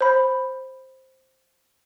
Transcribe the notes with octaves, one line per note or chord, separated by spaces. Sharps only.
C5 B5